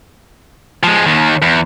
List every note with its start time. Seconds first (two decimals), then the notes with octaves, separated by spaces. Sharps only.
0.83 F3 G#3
1.06 D#2 D#3
1.42 E2